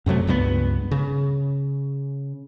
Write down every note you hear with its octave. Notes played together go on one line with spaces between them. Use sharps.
F#2 C3 F#3 A3
C#2 G2 F3 B3
C#3